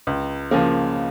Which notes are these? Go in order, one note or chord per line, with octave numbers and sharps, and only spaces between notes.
C#2
C#3 F3 A#3